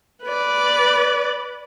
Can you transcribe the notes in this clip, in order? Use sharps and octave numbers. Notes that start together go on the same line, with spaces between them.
B4 D5